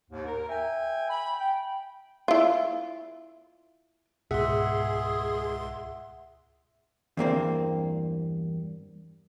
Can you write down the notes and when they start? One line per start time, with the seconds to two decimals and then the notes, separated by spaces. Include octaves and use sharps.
0.11 D#2 G#2
0.26 A#4
0.49 E5 G5 G#5
1.10 B5
1.40 G5
2.28 E4 F4
4.31 C#2 G#2 B2 G#4 E5 F#5 C6
7.17 E2 G2 A#3 C4